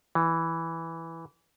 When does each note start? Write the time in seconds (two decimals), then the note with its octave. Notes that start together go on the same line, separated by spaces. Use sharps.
0.15 E3